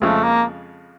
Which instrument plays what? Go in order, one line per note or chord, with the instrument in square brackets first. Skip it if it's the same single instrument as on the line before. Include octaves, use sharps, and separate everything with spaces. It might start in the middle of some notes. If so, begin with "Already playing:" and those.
[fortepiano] F2 C#3 F3 G#3 [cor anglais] A3
[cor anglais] A#3